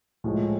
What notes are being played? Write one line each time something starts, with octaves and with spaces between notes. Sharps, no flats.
A2 F3 G#3